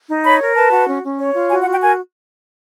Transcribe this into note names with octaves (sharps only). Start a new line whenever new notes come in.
D#4
C#5 B5
A#4
B4 A5
F#4
C#4
C#4
C#5
F4
F#4 G#5
F#5
F#4
G5
A#4 G#5